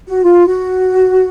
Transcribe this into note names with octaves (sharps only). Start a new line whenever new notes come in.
F#4
F4
F#4